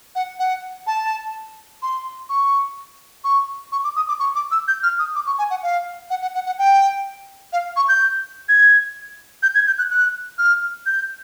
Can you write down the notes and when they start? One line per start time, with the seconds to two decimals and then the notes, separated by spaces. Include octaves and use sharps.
0.15 F#5
0.39 F#5
0.87 A5
1.82 C6
2.29 C#6
3.24 C#6
3.72 C#6
3.84 D6
3.96 D#6
4.09 D6
4.20 C#6
4.35 D6
4.51 E6
4.68 G6
4.83 F6
4.99 D#6
5.15 D6
5.26 C#6
5.39 G#5
5.50 F#5
5.63 F5
6.10 F#5
6.22 F#5
6.35 F#5
6.46 F#5
6.58 G5
7.53 F5
7.77 C#6
7.89 G6
8.49 G#6
9.43 G6
9.55 G#6
9.67 G6
9.78 F#6
9.90 F#6
10.38 F6
10.86 G6